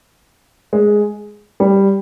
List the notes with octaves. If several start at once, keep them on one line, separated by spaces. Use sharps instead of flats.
G#3
G3